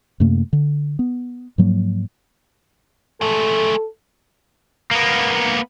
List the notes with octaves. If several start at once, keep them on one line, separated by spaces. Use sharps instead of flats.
F#2 C3 A3 A#3
D3
B3
G#2 F3 F#3 A#3
G#3 A3 A4
A#3 B3